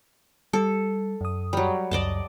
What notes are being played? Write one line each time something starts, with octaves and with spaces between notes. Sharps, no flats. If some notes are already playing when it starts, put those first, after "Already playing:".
G3 A4
F#2 D#6
F#3 G3
C#2 F#2 D5 D#5 A5